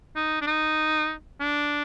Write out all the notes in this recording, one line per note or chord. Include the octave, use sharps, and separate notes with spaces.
D#4
D4
D#4
D4